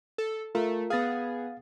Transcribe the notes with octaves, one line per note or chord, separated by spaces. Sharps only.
A4
A3 F4 A#4
B3 G#4 F5 A6